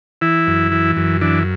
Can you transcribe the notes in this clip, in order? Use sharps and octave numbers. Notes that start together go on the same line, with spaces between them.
E3 E4
F#2
E3
F#2
E3 D4